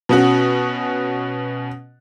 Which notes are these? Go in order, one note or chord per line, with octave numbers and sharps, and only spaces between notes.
B2 C#4 F#4